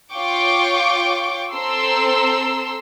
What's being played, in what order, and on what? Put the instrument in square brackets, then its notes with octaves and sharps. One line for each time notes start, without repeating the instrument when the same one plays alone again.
[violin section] F4 C#5 G5 C#6 D6
C4 A4 A#5 C6 E6